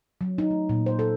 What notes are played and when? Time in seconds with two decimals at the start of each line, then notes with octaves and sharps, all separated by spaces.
0.21 F#3
0.38 D#4
0.50 A3
0.69 A#2
0.86 C5
0.99 A4